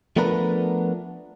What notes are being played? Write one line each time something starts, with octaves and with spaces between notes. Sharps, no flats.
F3 A3 B3 D4 A#4 B4